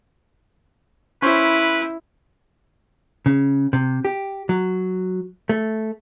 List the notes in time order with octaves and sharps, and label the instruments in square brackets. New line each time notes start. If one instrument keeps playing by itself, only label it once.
[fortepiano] C#4 C5 [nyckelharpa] E4 [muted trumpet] B4
[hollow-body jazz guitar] C#3
C3
G4
F#3
A3